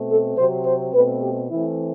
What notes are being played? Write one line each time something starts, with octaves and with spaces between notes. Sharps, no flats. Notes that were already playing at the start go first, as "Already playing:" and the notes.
Already playing: B2 A3 C4
A4
C3 F#3 C4 C5
C5
B2 A3 C4 B4
G4
E3 A3 C4 E4